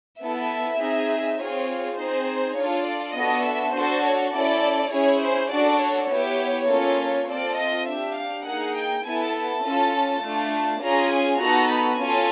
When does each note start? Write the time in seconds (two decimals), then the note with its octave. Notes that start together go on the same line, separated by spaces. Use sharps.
0.22 B3 E4 A4 E5
0.80 C4 D#4 G#4
1.40 C4 F4 G#4 C#5
1.98 C4 D#4 G#4 C5
2.57 D4 F4 A4 C#5
2.86 D5
3.16 B3 D4 F#4 A4 D#5
3.46 E5
3.74 D4 F#4 A4 C5
4.05 C#5
4.33 C#4 E4 A4 D5
4.92 C#4 E4 G#4 C#5
5.22 C5
5.51 D4 F#4 A4 D5
5.81 C#5
6.10 B3 E4 G4 C#5
6.69 A#3 C#4 F4 A4
7.28 C4 F4 A4 D5
7.57 D#5
7.87 D4 G4 E5
8.16 F5
8.45 A#3 D#4 G#4 F#5
8.75 G5
9.05 B3 E4 A4 G#5
9.33 A5
9.64 C#4 F4 A4
10.23 A3 D4 F4
10.81 C#4 F4 G#4 A#5
11.11 G#5
11.40 B3 D#4 F#4 A4 A#5
11.70 B5
11.99 C#4 F4 A4 G#5